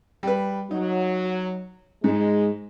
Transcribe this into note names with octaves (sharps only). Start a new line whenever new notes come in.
G3 B4
F#3 D#4
G#2 G#3